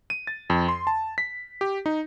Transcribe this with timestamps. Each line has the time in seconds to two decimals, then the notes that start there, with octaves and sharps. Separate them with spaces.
0.10 D#7
0.27 A6
0.50 F2
0.68 C6
0.87 A5
1.18 B6
1.61 G4
1.86 D#4